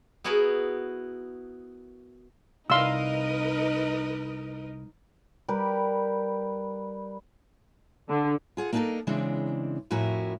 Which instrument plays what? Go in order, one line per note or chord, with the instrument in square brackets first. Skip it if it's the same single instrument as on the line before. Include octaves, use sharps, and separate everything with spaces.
[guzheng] B3 E4 F#4 G#4 A#4 B4
[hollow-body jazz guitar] C2 C6 [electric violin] D#4 [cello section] A#4 B4 D#5 [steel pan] F5 E6
[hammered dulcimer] G3 G4 A#4 B4
[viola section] D3
[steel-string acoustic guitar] F4 G#4 F#5
A#3 D4 D#4 G4 A4 A#4
C#3 E3 G#3 C4 D4
F2 A2 E4 F#4 A#4 G#5